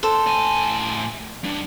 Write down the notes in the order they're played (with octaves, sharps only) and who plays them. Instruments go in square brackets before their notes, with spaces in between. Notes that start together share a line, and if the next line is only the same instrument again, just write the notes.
[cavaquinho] A4 C5
[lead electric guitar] A2 G#5
G3 D4